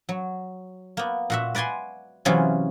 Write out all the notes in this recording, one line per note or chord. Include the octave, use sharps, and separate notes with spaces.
F#3
A#3 B3
A#2 F#4 E5
B4 D5 F#5 G#5 C6
C3 E3 F#3 B3 C#4 F4